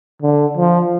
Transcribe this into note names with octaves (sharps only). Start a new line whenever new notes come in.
D3
F3